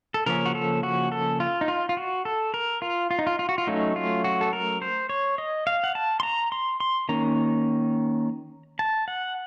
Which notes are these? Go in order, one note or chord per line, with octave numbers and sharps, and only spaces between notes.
A4
C#3 F3 A#3 C#4 A#4
F#4
A4
F#4
A4
F4
D#4
F4
F4
F#4
A4
A#4
F4
F4
D#4
F4
F4
F#4
F4
F#3 A3 C#4 D#4
F4
F#4
A4
A#4
C5
C#5
D#5
F5
F#5
A5
C6
A#5
C6
C6
D#3 A#3 C#4 A#5
A5
F#5